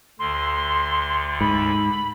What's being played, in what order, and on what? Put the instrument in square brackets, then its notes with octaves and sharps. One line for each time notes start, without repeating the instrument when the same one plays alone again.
[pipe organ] D2 D3 [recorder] C6
[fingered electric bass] G#2 [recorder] B5